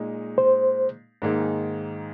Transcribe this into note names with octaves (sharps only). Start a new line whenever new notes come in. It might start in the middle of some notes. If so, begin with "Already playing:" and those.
Already playing: A#2 G#3 D#4
C5
G#2 D#3 A#3 D#4 G#4